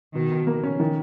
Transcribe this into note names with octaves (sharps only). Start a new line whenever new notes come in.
B2 D#3
B2
A#3
C#4
D#3